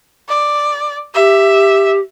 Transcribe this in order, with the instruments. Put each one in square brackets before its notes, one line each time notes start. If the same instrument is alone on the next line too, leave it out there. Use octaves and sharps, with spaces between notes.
[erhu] D5
[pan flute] G4 [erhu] E5